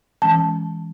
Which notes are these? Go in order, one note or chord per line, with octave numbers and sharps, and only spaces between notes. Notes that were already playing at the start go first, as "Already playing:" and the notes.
E3 G#3 C#4 A5